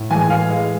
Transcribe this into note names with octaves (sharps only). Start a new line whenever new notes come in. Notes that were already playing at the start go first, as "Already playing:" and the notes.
Already playing: A2
E3 G#3 G#5
A2 F5
E3 G#3